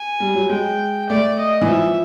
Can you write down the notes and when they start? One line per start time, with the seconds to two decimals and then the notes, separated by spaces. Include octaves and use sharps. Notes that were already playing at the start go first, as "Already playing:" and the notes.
Already playing: G#5
0.20 G3
0.35 F#3
0.50 G#3 G5
1.09 A3 D5
1.39 D#5
1.61 E3
1.68 F3 E5